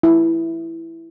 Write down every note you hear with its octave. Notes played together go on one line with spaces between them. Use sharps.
E4